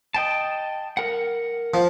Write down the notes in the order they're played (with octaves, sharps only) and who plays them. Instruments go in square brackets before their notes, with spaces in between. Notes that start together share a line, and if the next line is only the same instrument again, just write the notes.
[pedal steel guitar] D#5 G5 A5
A#4 F#5
[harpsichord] F3